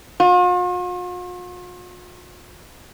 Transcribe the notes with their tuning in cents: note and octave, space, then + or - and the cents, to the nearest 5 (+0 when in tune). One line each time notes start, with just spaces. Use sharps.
F4 +45